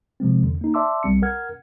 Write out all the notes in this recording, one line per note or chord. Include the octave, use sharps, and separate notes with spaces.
C3 F3 G#3 C4
E2 D3
A#3 D#4
D5 E5 A5 C6 D6 E6
B1 G3 C4 C#7
A#4 F#5 F6 G#6